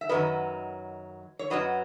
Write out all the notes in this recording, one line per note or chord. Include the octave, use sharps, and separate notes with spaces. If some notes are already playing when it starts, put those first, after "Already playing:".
E5
F#2 D#3 F#3 B4 D#5
C#5
F#2 D#3 F#3 B4 D#5